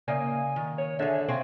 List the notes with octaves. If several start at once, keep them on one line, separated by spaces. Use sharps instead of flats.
C#3 A#3 D5 E5 F5 G#5 D#6
D#3
C#5
D3 G#4 E5
C3 C4 G#4 F5 G5 C#6